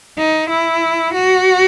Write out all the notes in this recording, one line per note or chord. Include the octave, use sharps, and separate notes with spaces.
D#4
E4
F#4